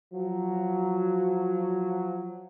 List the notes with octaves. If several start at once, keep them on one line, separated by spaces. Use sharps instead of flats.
F3 F#3